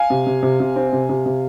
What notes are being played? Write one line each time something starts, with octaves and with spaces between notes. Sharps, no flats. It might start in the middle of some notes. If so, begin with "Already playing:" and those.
Already playing: F5 G#5
C3
C3
C3
C3
C4
C3
C3
C3